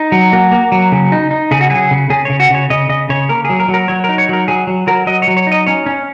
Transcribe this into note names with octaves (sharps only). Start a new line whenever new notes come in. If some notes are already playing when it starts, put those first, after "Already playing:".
Already playing: D#4
F#3
A#3 F#4
A#3
F#3
C#3
D#4
D#4
C#3 G#4
F#4
F#3 G#4
C#3
C#3 G#4
C#3 C#5
F#4
C#3 C#5
C#3 D#5
C#3 D#5
C#3 C#5
A#3 A#4
F#3 G#4
A#4
F#3
A#4
F#3 C#5
A#4
D#4
C#5
F#3 A#4
F#3 G#4
F#3
F#3 A#4
F#3 D#5
C#5
F#3
C#5
D#4 D#5
C#4 C#5
C#4